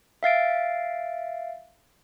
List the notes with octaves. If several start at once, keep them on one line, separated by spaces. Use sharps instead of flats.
E5 F5 A6 D7